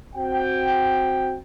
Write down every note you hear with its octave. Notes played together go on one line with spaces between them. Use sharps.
C4 F#4 G5